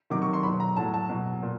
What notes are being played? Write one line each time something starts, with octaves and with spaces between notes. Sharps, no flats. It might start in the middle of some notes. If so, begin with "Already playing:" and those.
C3 D#3 F#3 D6
C#6
C6
B2 F#3 B5
A#5
A2 F#3 A5
A5
B2 F#3
A#2